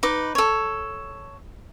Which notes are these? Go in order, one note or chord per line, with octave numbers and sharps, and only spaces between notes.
D#4 B4 D6
A4 C#5